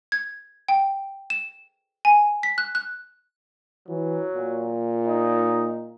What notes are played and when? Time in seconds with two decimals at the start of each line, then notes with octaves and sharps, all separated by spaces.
0.12 G#6
0.68 G5
1.30 E7
2.05 G#5
2.43 B6
2.58 F#6
2.75 F#6
3.88 E3 F#3
4.35 A#2
5.07 D#4